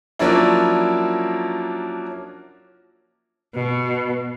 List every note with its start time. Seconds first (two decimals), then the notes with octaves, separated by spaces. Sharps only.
0.19 F3 F#3 A#3 C#4 D4 E4
3.54 B2